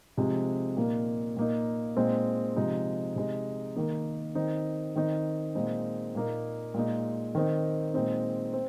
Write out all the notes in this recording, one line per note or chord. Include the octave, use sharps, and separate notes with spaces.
C3 F3 G#3 D#4
A#2 A#3 D#4
A#2 A#3 D#4
A#2 G#3 C4 D#4
C3 F3 G#3 D#4
C3 G#3 D#4
D#3 A#3 D#4
D#3 C4 D#4
D#3 C4 D#4
A#2 G#3 C4 D#4
A#2 A#3 D#4
A#2 G#3 D#4
D#3 C4 D#4
A#2 G#3 C4 D#4
C4